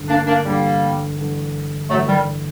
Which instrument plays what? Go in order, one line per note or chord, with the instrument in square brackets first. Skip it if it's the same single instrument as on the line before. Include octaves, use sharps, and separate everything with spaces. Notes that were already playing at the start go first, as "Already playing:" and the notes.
Already playing: [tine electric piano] A1 G2 D3
[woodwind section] A#3 D4
A#3 D4
[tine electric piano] A1 G2 D3 [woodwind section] G3 A#3
[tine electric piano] A1 G2 D3
[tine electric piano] A1 G2 D3 [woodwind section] F#3 A3
[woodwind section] D#3 G3